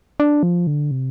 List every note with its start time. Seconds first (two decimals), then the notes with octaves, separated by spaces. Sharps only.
0.20 D4
0.43 F3
0.67 D3
0.91 C3